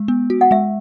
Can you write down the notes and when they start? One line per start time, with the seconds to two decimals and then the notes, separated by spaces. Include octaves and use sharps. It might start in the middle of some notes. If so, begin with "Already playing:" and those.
Already playing: G#3
0.08 B3
0.30 F#4
0.41 F#5
0.51 G#3 E5